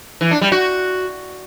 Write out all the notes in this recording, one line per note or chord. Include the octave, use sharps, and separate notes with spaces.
E3
D4
G3
F#4